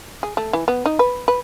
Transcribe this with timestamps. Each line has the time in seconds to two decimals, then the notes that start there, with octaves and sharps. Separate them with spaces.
0.23 G#4
0.37 A3
0.53 E3
0.68 B3
0.86 D#4
0.99 B4
1.28 B4